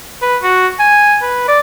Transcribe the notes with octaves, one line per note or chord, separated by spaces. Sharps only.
B4
F#4
G#5
B4
D5